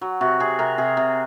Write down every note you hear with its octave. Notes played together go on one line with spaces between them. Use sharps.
F#3
C3 F#4
C3 G#4
C3 A#4
C3 G#4
C3